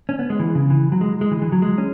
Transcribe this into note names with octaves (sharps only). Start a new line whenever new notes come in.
C#4
B3
G#3
E3
C#3
E3
F#3
G#3
G#3
E3
E3
F#3
G#3
C#4